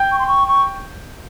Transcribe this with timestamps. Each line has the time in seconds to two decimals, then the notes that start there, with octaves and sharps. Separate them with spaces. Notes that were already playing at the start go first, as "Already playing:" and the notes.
Already playing: G5 G6
0.12 C#6
0.19 C6
0.27 C#6
0.48 C#6